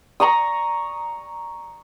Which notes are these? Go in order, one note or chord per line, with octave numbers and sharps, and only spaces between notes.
A#5 C#6 D#6